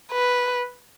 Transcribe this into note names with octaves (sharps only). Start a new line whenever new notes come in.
B4